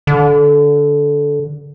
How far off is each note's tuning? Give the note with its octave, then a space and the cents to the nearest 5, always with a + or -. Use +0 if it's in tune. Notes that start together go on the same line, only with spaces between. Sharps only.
D3 -15